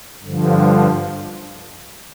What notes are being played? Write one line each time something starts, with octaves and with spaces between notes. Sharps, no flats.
G2 D3 F3